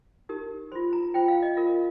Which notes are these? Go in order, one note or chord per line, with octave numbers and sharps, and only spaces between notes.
D#4 G4 A#4
F4 C5 C6
A#5
F4 C5 G5
F5
D#5
F4 A#4 F5